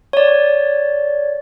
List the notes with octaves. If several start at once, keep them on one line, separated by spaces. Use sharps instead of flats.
C#5 D5